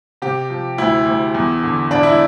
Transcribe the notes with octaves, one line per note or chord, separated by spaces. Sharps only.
C3 G4
F3
D2 E4
D2
E2
D3
E1 D4
E4